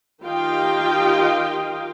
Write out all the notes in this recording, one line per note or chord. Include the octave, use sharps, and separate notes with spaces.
D#3 F4 G4 D#5 F5 G5